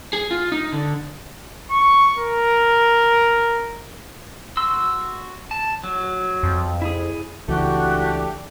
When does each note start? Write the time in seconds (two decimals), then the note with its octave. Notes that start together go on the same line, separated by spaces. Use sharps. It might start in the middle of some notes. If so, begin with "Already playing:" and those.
0.13 G#4
0.31 F4
0.52 D#4
0.72 D3
1.71 C#6
2.18 A#4
4.57 F#4 C6 E6
5.51 A5
5.84 F#3
6.43 F2
6.82 E4 G#4
7.48 C#2 E3 A3 D4 F#4 G4